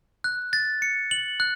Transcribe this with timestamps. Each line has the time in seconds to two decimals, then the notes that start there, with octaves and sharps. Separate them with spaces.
0.24 F#6
0.53 A6
0.82 C#7
1.11 F#7
1.40 F#6